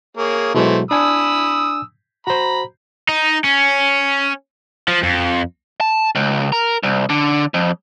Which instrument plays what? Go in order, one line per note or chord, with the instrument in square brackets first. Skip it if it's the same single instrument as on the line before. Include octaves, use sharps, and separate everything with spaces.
[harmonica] A#3 G#4 C#5
[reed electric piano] B2 F#3 G#3 [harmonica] E3 A3 C5
[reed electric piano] D4 G#5 [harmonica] B5 D#6 E6
[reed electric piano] F#4 C5 [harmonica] A#5 B5
[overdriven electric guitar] D#4
C#4
F3
F2
[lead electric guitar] A5
C#2
A#4
C2
D3
F2